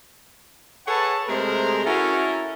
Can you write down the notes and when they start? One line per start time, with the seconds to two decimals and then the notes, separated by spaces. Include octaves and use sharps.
0.87 G#4 A4 B4 C#5 F#5 A5
1.28 C3 G#3 A3 G#4 A#4 C5
1.85 C#4 E4 F#4 A4 A#4